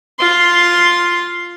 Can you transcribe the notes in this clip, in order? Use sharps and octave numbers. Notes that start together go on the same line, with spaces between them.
F4 C6